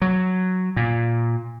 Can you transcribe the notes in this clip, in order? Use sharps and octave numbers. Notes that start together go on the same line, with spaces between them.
F#3
A#2